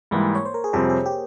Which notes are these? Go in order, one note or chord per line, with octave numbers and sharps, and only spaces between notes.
G#2 E3 G3 A#3
C#5
C5
A#4
G#4
F2 C3 G3 C4 G4
G#4
G4